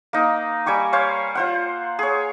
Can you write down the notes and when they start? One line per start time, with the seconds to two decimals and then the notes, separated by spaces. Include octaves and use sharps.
0.13 A#3 D#4
0.66 G3 G#5 C#6 D6
0.93 C5 C#5 F5 C#6
1.35 F4 C5 F#5
1.99 G#4 C#5